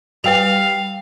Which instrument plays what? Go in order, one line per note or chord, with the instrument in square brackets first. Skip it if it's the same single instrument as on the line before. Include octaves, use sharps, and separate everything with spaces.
[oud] G3 [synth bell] B4 G5 F7 [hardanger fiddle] F5